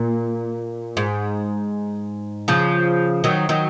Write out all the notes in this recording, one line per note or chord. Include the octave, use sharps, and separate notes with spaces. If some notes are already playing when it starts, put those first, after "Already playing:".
Already playing: A#2
G#2
C#3 F3
D#3 F#3
D#3 F#3